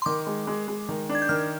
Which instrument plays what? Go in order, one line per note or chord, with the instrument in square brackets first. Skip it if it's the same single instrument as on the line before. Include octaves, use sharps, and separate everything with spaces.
[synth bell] C6
[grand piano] D#3 [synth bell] D6
[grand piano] G#3
G#3
G#3
D#3
D4
[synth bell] G#6
G6
[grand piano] D#3 [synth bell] F6